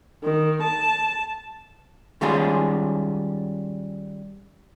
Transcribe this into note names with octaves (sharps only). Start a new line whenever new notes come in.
D#3
A5
D#3 G3 G#3 C#4 F4 G#4